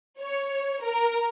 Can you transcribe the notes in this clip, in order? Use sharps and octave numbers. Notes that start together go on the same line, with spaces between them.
C#5
A#4